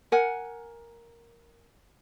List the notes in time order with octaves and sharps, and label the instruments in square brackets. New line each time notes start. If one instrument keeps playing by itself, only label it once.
[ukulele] A#4 F#5 G#5